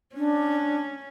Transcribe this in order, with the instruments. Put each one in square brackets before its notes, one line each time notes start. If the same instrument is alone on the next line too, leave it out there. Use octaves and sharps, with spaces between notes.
[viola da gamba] C#4 [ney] D4